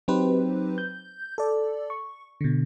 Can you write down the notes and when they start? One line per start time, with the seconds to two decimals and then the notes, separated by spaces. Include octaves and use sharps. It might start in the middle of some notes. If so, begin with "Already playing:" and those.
0.08 F#3 C4 D#4 G4 B4 C5
0.78 G6
1.38 A4 D5
1.90 C#6
2.41 B2 D3